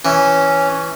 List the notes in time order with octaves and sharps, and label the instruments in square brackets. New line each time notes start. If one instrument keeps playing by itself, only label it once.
[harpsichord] E3 [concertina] C#4